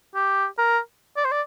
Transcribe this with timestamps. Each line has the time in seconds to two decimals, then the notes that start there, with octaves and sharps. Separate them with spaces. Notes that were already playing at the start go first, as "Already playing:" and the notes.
0.15 G4
0.58 A#4
1.16 D5
1.25 C5
1.31 D5